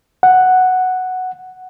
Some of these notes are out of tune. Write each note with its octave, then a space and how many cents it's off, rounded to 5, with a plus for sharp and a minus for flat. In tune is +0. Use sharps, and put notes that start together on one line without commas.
F#5 +0